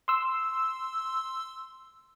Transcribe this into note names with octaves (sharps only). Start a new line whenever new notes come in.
C6 E6